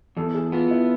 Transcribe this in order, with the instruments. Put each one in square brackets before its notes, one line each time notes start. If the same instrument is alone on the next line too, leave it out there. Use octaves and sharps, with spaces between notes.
[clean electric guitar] E2 [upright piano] A4
[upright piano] G#4
[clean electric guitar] B3 [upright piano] F4
[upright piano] E4